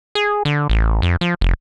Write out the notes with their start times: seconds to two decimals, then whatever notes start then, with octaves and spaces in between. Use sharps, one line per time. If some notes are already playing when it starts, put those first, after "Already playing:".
0.15 G#4
0.45 D3
0.70 A1
1.02 F2
1.21 F3
1.41 F1